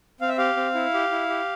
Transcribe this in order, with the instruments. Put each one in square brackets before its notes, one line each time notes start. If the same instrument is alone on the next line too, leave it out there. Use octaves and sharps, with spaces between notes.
[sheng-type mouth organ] C4 F5
E5
G4 F5
C4
E4
G4
E4
G4